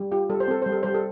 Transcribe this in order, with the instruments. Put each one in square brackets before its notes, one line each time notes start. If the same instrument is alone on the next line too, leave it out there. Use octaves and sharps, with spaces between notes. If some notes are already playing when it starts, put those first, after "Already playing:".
Already playing: [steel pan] G3
F4 G4
G3 A4
C5
C4 A4
G3 C5
A4
G3 C5
A4